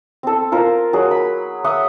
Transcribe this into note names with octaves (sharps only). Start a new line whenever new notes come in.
C4 A4
F4 A#4 C5
F#3 G#4
B5
E5 F#5 D#6